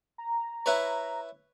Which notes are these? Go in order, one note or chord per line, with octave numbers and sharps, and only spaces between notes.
A#5
E4 B4 C#5